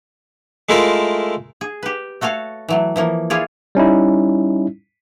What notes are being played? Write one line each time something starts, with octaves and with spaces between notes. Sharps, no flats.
G#3 A3 E4 F4 A#4
G#4
G4 B4
A3 F#4 A4 C#5 F5
E3 F#3 A3
E3 F3 A#3
E4 F4 G#4 C#5 D5
G3 C#4 D#4 E4